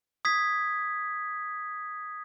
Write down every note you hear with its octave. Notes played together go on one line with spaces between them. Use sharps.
D#6 G#6 B6